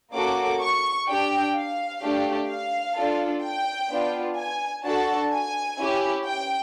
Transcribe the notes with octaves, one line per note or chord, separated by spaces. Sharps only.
A#3 C#4 F#4 A4 D6
C#6
D4 G4 G5
F5
A3 D4 G4
F5
D4 F4 A4
G5
B3 D4 F4
G#5
D4 F#4 A4 A5
G#5
C#4 E4 G4
G5